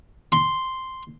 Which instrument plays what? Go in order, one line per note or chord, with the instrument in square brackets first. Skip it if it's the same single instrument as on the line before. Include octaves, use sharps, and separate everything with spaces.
[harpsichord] C6